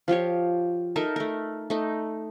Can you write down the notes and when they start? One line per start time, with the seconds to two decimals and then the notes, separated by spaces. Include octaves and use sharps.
0.08 F3 F4 G4 C#5
0.96 D#4 A4 A#4 E5
1.16 A3 A#4
1.70 A3 D#4